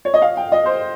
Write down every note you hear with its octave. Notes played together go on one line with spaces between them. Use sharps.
C#5
D#5
F5
G5
D#5
C5